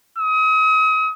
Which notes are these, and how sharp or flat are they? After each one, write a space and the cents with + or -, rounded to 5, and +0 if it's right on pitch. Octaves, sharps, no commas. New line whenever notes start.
D#6 +40